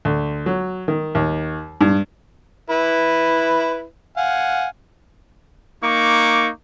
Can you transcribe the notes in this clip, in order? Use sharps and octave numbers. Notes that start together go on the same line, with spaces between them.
D2
F#3
D#3
D#2
G2
E4 B4
F5 F#5 G#5
A#3 D#4 C#6 D6